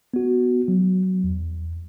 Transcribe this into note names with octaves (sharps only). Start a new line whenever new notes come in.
B3 F#4
F#3
E2